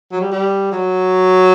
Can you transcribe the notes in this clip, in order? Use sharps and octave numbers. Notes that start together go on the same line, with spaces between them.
F#3
G3
G3
F#3